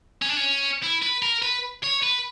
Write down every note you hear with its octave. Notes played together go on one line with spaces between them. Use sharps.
C#4
D4
C#4
E4
B4
A#4
B4
C#5
B4